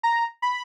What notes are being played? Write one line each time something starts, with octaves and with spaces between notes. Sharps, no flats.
A#5
B5